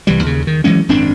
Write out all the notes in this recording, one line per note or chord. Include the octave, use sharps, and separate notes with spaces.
C2 E3 G3
D#2 C#3
D#3
E3 F#3 G#3 C#4
G#1 F#2 C4 D4